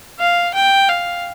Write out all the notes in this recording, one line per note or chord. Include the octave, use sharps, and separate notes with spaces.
F5
G5
F5